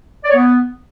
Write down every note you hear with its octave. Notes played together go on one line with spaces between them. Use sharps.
D5
C#5
B3